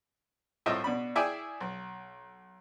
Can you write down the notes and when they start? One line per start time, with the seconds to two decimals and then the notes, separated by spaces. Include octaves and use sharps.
0.66 C2 A2 F4 C5 D#5 E5
0.84 B2 D4 B5
1.16 E4 G#4 D5 E5 G5 G#5
1.61 B1